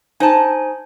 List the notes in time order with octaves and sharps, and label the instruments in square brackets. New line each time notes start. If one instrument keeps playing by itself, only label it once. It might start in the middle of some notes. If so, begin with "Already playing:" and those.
[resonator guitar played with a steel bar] D#4 A5 [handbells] C5 G#5